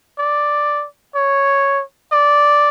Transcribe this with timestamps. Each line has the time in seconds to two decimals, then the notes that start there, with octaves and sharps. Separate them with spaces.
0.18 D5
1.15 C#5
2.12 D5